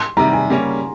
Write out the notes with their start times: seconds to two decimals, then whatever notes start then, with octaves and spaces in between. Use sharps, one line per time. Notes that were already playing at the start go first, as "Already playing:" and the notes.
Already playing: C6
0.17 C3 D#3 G3 A#5
0.33 G#5
0.49 C#3 G3 A#3 C#4